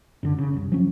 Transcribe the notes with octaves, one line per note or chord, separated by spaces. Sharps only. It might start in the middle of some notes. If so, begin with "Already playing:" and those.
F#2 D3
C#3
C2 F#2
F3 F#3 C#4